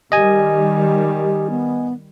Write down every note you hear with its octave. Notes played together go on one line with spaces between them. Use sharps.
D#3 G3 G4 D#5 G#5
B3